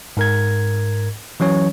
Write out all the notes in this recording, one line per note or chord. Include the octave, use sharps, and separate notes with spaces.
G#2 A#4 G#6
E3 F#3 C#4 C#5